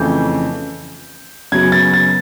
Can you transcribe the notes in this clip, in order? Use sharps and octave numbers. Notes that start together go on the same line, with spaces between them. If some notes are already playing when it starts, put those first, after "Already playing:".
Already playing: F2 C#3 E3 A3 G6
F#2 C#3 F#3 B3 G#6
A6
A6